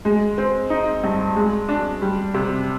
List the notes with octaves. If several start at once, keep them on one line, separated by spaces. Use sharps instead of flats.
G#3
C4
D#4
G2
G#3
D4
G3
C3